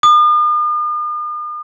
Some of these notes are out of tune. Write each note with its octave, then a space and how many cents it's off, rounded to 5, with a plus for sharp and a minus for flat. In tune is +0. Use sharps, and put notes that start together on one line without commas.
D#6 -45